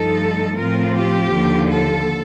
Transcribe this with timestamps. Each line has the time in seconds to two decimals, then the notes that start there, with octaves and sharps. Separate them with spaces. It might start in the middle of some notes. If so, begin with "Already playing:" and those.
Already playing: G2 F3 A3 D#4 A4
0.58 A2 F3 C4 F4 A#4
0.96 G4
1.33 D#2 D3 F3
1.70 A4